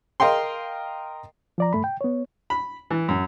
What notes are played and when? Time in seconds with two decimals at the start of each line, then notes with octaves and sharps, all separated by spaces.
0.20 A#4 D#5 F5 G5 C6
1.58 F3 D5 A#5
1.73 G2 A3 B5
1.84 G5
2.01 B3 C#5
2.50 B5
2.91 E3
3.08 F#2